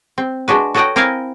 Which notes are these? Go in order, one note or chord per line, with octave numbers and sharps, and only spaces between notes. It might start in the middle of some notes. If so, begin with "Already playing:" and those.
C4
G#3 D4 F#4 B4
F#4 A4 C#5 D#5 F#5 G5
C4 E4 A#4 D#5 F5 G#5